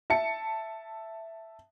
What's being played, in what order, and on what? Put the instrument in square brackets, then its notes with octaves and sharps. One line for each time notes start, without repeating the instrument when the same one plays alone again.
[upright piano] E5 A5 C#7